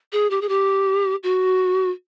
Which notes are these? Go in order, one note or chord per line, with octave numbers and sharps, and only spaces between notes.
G#4
G4
G#4
G4
F#4